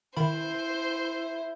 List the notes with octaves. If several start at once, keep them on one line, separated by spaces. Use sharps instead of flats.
D#3 E4 C5 B5